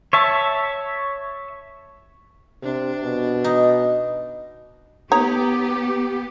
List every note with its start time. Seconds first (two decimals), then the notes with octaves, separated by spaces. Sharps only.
0.13 C#5 E5 A5
2.63 C3 D4
3.03 B2
3.44 D#4
5.12 B3 D#4 G4 C#5 A#5